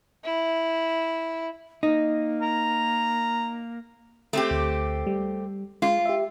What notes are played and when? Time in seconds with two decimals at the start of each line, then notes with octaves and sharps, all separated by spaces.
0.25 E4
1.83 A#3 D#4
2.42 A#5
4.33 A3 C4 G4
4.51 D2
5.07 G3
5.82 G#3 F4
6.06 G4 E5